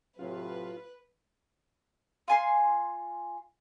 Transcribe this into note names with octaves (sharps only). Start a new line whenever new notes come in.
A2 C3 F#3 F4 B4
F4 G#5 C6